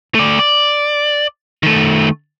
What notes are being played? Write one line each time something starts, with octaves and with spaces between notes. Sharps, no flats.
A3 D5
D5
D#3 A3